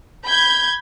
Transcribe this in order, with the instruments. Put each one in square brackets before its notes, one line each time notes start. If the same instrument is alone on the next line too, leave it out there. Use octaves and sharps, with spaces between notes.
[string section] B5 G6 G#6